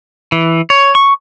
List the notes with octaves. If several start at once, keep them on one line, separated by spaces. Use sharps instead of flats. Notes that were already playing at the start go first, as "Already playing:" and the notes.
E3
C#5
C#6